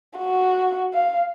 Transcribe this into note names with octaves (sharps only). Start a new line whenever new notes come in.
F#4
F5